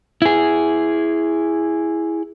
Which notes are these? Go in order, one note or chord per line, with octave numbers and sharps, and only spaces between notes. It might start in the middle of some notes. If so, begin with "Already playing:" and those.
E4 G#4